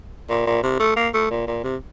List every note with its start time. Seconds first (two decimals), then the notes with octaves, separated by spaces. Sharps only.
0.30 A#2
0.47 A#2
0.63 C3
0.80 A3
0.96 A#3
1.14 A3
1.31 A#2
1.47 A#2
1.64 C3